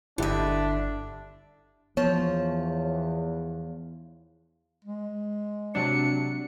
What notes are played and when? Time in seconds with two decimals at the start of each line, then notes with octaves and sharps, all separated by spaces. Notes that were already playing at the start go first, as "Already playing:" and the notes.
0.18 G1 D3 D4 E4 G4 D#5 E5
1.97 E2 F3 B3 C#5
4.85 G#3
5.75 C3 F#3 D4 C#7